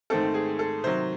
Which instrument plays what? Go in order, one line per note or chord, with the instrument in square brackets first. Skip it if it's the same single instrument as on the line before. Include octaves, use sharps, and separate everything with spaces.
[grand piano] G#2 D#3 A3 C4 A4
G#4
A4
C3 D#3 F#3 C5